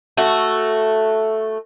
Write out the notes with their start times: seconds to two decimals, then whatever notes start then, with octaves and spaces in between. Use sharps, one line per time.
0.17 A3 F#4